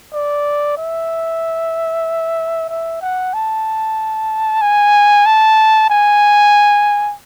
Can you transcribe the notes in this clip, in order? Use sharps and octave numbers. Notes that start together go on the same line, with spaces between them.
D5
E5
E5
F#5
A5
G#5
A5
G#5